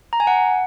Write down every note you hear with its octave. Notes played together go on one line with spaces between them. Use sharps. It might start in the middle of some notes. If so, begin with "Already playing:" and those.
A#5
G#5
F#5